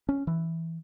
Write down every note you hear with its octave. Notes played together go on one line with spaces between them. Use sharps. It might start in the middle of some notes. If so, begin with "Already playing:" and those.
C#4
E3